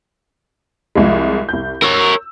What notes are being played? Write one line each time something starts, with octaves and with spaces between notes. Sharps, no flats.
C2 F3 G#3
C2 G6
A#4 C#5 E6